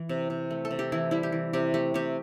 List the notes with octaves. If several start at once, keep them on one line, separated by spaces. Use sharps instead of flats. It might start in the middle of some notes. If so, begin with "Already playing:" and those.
Already playing: E3
C3
C3
A3
A4
C3
G4
E3 E4
G3 E4
G4
E3
C3 G4
A3 G4
C3 G4